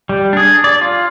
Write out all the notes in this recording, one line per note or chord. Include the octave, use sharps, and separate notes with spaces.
G3
D4 G#4
D5
F4